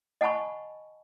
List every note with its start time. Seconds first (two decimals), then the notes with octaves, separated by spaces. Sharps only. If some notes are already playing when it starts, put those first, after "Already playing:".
0.21 D#5 F#5 G#5 A5 B5 C#6